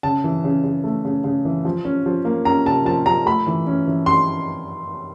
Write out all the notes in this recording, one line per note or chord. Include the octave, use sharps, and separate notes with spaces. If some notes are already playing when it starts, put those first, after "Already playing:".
C#3 A5
E3
C#3
C#3
A3
C#3
C#3
E3
F3
C#4
F3
A#3
C#4 A#5
C3 A5
F3 A5
F3 A#5
A3 B5
E3
C#4
E3
C6